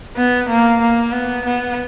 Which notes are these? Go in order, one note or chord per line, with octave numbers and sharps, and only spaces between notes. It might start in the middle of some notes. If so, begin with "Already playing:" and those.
B3
A#3
A#3
B3
B3